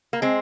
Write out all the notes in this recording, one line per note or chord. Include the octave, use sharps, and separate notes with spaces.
A#3
G#3 C4